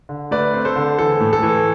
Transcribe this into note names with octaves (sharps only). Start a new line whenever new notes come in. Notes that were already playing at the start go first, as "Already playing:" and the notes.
D3
A3 B4 D5
C4
A4 C5
D3
E3 A4
A2
A4
E3